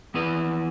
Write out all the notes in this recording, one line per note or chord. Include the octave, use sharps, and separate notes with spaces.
E3 B3 E4 B4 D5